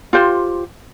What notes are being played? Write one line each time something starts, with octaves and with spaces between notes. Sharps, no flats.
F4 G4 C5